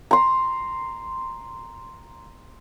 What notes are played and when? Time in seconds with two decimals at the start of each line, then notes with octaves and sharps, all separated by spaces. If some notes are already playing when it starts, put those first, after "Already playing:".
0.11 A#5 C6